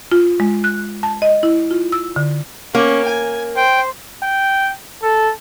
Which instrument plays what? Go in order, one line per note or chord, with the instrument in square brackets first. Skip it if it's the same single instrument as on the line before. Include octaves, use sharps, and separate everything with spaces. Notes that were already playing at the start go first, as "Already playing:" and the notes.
[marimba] F4
G#3
F#6
A5
D#5
E4
F4
E6
D3
[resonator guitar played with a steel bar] A#3 [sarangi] C#4
[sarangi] G#5
[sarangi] C5 [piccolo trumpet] G5
[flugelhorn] G5
A4